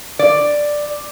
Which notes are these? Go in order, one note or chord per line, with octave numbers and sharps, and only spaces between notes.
D5